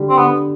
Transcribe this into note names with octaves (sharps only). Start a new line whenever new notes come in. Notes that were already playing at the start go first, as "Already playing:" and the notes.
Already playing: D3 G3
C4
D3 B3